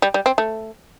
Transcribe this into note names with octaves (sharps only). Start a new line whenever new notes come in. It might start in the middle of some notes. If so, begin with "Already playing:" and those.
G3
G3
C4
A3